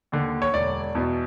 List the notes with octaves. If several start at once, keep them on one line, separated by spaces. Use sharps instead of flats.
D#2 D3
C#5
E1 D5
E2 B2